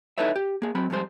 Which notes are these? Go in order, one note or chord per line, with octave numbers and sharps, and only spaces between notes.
D#4 E4 A4 B4 C#5 E5
G4
A#3 G#4
F#3 C4 B5
F2 G#2 G3 C5